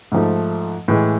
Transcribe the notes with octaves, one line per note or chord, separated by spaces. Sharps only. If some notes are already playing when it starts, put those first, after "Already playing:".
G#2 F3 A3
A2 E3 G#3